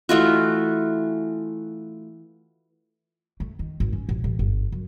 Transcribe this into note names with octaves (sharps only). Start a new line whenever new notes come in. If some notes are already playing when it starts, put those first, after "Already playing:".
E3 A3 F4 F#4
A3
D#3
G#1
C#4
A1
A1
G1
F#2